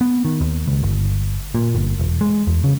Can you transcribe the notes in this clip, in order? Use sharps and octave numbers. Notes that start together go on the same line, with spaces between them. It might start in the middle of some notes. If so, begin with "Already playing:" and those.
B3
D#3
D#2
C#2
G1
A#2
G1
E1
G#3
E2
C#3